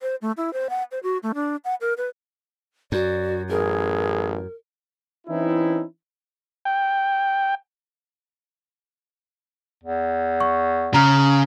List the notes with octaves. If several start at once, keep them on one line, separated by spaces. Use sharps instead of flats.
C5
A3
E4
C5
F#5
C5
F#4
A3
D4
F#5
A#4
B4
F#2 F#4 D5
A1 G#4 A#4
E3 C4 C#4 D#4 E4
G5
E2
C#6
C#3 A#5 F6